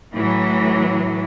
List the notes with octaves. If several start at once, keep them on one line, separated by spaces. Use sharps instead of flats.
A2 E3 F#3